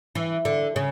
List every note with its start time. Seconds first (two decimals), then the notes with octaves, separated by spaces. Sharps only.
0.15 E3
0.45 D3
0.76 C#3